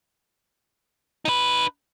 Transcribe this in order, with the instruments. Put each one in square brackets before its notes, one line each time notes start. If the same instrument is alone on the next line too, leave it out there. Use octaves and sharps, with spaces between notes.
[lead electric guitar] D#4 B4